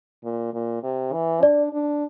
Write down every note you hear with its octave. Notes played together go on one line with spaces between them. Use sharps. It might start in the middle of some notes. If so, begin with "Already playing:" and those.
A#2
A#2
C3
E3
D4 D5
D4